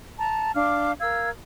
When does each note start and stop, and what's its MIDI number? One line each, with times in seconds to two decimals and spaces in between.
0.18 0.51 81
0.18 0.51 82
0.55 0.92 62
0.55 0.92 77
0.55 0.92 86
0.55 0.92 89
1.00 1.29 70
1.00 1.29 77
1.00 1.29 88
1.00 1.29 92